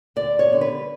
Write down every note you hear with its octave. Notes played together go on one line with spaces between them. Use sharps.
D2 D5
C#5
D3 G3 B3
B4